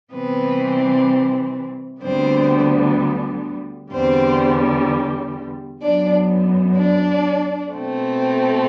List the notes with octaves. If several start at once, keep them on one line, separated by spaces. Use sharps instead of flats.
C3 E3 G3 B3 C4 B4
D2 D3 G3 B3 C4 C5
E2 D3 G3 C4 C5
F#2 F#3 B3 D4 D5
D4 D5
B2 A3 C4